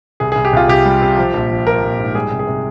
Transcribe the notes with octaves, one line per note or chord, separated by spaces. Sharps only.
C2 G#4
G#4
C2
G4
C2 F4
C2 G4
G3
C3
F3
A#1
F3
F3 A#4
A#1
G#2
G3 G#4
C3
G#4
C3